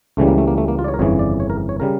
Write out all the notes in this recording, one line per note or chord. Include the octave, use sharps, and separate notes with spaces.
C#2 C#3 E3 G3 A3
A#3
A3
A#3
A3
A#3
F4
D5
C#5
A#4
G1 F2 C#3 E3 C#5
D5
C#5
A#4
C#5
C#3 G3 A#4